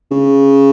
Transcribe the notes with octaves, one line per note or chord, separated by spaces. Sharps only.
C#3